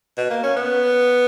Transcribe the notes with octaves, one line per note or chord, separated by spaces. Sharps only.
B2
A#3
C#4
B3